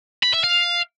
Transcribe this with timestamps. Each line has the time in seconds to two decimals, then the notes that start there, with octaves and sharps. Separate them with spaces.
0.23 B5
0.33 E5
0.44 F5